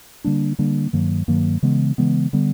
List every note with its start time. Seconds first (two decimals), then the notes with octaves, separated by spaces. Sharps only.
0.24 D3 G3 A#3 D4
0.59 D3 G3 A#3 D4
0.93 G2 D#3 F#3 A#3
1.28 G2 D#3 F#3 A#3
1.63 C#3 E3 G#3 B3
1.98 C#3 E3 G#3 B3
2.33 D3 G3 B3